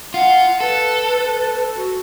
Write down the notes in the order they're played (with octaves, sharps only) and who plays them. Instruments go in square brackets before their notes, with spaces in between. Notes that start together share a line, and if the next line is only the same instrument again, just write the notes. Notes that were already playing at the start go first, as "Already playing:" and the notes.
[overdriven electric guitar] F4 [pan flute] F#5
[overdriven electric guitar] A4 [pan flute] B4
[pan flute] F#4